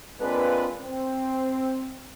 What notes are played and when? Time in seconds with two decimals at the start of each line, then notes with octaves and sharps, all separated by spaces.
0.21 G#3 A#3 C4 D4 F4 B4
0.81 C4